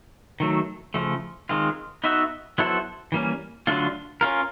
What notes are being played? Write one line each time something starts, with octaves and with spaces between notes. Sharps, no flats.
D#3 F#3 A3
C#3 F3 A3
D#3 G#3 C4 F4
B3 D#4 F#4 B4 E5
F#3 B3 E4 A4 C5
E3 G3 A#3 C#4
D3 F#3 A3 D4 F4
C#4 F4 A#4